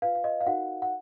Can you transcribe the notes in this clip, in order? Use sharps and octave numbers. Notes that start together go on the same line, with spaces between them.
F4 B4 F5
F5
D#5
F5
D#4 F#4 A#4 F#5
F#5